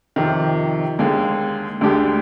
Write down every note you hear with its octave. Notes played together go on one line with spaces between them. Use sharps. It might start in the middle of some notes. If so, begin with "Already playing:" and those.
F2 C3 D#3
D#2 D3 G#3
D2 D3 G#3 D4 G4